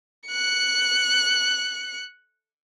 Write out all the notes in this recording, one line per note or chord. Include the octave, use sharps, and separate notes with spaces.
F#6 C#7